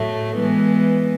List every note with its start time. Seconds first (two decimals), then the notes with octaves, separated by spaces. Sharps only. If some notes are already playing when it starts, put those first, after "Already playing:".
Already playing: A2 F#3 A3
0.37 E3 G#3 B3